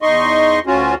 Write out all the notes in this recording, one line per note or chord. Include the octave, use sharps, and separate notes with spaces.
E2 D#4 D#5 C6 C#6
D2 C#4 F4 F#4